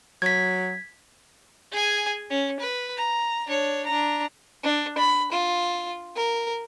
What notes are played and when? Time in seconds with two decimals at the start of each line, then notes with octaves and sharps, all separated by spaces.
0.22 F#3 G#6 B6
1.72 G#4 G#5
2.30 C#4
2.60 B4
2.97 A#5
3.47 D4 C#5
3.86 D4 A#5
4.63 D4
4.98 B5
5.32 F4
6.16 A#4